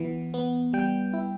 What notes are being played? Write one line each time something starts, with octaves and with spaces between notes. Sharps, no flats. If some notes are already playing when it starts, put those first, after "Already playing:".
Already playing: E3 B3
B3
G3 G5
E4